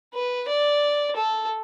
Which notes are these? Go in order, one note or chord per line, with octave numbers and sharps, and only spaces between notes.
B4
D5
A4